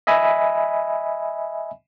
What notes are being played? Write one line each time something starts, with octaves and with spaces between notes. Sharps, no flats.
D#5 E5 G#5 B5